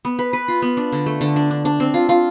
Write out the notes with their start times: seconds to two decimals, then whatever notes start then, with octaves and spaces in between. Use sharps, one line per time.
0.05 B3
0.19 B4
0.33 B4
0.48 F4
0.62 B3
0.77 D4
0.92 D3
1.06 A3
1.21 D3
1.36 D4
1.51 D4
1.65 D4
1.80 C4
1.94 F4
2.09 F4